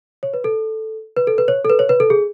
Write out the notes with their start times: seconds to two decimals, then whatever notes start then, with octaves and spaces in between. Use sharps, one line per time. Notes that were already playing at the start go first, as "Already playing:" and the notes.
0.23 C#5
0.34 B4
0.44 A4
1.17 B4
1.27 A4
1.38 B4
1.48 C#5
1.65 A4
1.70 B4
1.79 C#5
1.89 B4
2.00 A4
2.10 G#4